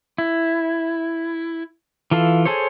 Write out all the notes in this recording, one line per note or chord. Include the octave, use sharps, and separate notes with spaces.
E4
E3 F4 A4 F5
G#4 A4 C5 C#5